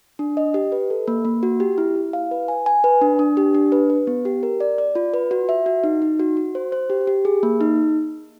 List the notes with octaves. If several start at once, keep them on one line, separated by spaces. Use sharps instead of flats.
D4
D#5
G4
B4
A4
A#3
A#3
F#4
G4
E4
E4
F5
B4
G#5
G#5
B4
D4
D4
G4
D4
B4
B4
B3
G4
A#4
D5
D5
F4
B4
F#4
E5
F#4
D#4
D#4
F#4
F#4
C5
C5
G4
G4
G#4
A#3
D#4